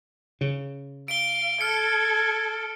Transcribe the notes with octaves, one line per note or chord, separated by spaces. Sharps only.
C#3
F5 D7 G7
A4 F6 G#6 C#7